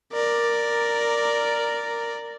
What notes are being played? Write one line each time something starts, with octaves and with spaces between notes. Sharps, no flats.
A#4 D5